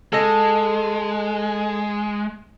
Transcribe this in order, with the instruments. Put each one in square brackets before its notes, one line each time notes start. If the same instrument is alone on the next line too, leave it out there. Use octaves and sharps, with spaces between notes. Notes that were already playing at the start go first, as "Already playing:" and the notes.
[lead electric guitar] G#3 [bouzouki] A4 D#5